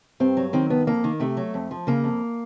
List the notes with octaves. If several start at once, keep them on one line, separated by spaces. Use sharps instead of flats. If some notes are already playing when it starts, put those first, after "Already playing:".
G2 C4
F#3
D#3 C4
G2 B3
F2 A#3
D#3
C3 A3
F#3
F2
F3
C#3 A#3
F2